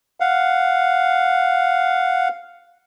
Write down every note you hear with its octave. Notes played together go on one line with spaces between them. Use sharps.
F5 F#5